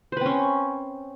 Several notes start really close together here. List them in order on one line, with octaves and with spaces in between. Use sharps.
C5 B4 C4 C#4